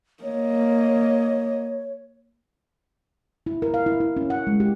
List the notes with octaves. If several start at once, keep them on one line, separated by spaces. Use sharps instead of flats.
A#3 C#5 D#5
E4
A#4
F5
E4
E4
C#4
F#5
G#3
G4